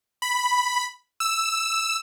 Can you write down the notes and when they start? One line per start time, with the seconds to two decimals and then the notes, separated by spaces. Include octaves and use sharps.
0.22 B5
1.20 E6